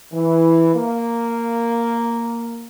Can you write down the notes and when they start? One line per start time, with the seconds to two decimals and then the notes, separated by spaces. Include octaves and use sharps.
0.13 E3
0.74 A#3